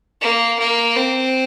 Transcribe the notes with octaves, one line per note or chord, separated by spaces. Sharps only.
A#3
A#3
C4